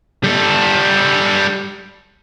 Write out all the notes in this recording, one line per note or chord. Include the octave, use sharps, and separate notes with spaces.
G3 A4